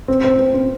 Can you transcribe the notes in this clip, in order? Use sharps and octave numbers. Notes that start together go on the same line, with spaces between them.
C4
C4
C4
C4